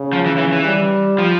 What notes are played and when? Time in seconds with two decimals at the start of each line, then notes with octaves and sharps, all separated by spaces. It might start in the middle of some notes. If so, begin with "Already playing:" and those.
Already playing: C#3
0.13 F3
0.26 E3
0.38 E3
0.52 E3
0.65 G3
1.19 F3